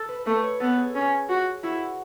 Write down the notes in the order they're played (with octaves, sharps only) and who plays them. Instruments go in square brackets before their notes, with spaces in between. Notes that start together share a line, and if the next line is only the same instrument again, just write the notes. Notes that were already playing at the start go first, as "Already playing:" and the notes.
Already playing: [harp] A4
B4
[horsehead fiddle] A3 [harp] B4
[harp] C#5
[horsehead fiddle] B3 [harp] A4
[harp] G#4
[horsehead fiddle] C#4
F#4
[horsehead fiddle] E4 [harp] F#4